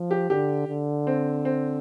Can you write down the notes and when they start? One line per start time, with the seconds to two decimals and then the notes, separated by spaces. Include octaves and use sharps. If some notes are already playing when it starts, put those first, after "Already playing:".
Already playing: F3
0.11 G4
0.30 D3 G4
0.68 D3
1.07 C4
1.45 C4